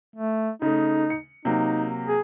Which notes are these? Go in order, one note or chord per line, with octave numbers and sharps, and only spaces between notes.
A3
C#3 A3 D#4
C#7
C3 F#3 A#3 D#4
G#4